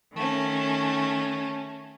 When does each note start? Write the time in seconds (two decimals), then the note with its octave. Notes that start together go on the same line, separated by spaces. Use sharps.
0.14 D#3 A3 C#4